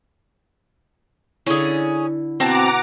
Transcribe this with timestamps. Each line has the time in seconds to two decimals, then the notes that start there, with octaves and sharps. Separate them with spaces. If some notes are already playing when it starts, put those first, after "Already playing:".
1.46 D3 C#4 E4 G#4
2.40 B2 C4 F#4 F#5 A5 A#5 D6